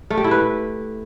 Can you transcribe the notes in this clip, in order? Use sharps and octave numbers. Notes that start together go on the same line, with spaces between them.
A3
G4
E4
B4